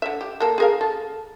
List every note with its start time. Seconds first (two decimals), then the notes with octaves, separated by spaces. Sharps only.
0.02 D3 E5
0.21 G4
0.40 A#3 A4
0.58 G#4 A#4 F5
0.81 A4